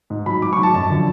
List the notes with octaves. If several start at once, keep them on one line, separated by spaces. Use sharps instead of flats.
G#2
F#3 B5
G#2 D6
C#6
F#3
A5
F#2 A5
D3 F3